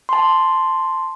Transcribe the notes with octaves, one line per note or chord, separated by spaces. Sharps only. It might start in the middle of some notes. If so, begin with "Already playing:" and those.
A5 C6